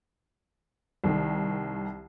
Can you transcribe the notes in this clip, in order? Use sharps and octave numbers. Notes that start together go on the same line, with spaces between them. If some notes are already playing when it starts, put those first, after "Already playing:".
C2 D#3